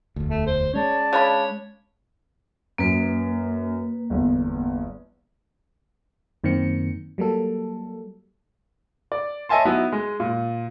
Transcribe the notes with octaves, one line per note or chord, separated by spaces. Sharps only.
E1 D2
A3
C5
G#3 C#4 C#5 D5 A5
C#3 D4 C#5 B5
F#2 A#3 B4
G1 E2
F#2 D#3 A#3 C4 C#7
F#3 G3 A#3 A4
D5
C#5 D#5 E5 G#5 A5 C6
F#3 B3 D#4 E4
G#3
A#2